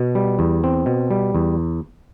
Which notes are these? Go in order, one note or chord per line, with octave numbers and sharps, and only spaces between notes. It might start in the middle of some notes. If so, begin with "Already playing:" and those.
Already playing: B2
G3
E2
C4
B2
G3
E2